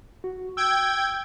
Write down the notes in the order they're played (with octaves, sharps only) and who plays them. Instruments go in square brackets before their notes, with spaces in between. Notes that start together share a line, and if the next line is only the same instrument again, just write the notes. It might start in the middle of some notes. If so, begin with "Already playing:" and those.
[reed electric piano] F#4
[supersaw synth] G5 G#6 [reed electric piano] E6